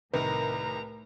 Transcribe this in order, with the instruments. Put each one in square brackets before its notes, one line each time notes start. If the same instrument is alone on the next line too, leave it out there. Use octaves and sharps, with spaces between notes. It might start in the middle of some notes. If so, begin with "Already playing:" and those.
[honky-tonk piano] C2 D#3 [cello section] A2 A#4 [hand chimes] B4 [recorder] A#5